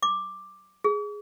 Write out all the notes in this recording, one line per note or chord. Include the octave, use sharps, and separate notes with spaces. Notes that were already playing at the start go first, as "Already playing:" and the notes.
D6
G#4